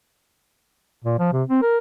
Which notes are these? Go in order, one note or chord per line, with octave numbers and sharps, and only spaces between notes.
A#2
F3
C3
C4
A#4